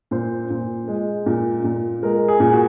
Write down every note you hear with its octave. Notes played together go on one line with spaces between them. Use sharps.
A#2 C5
A#2
G#3
A#2
A#2
G#3 A#4
G#4
A#2
F#4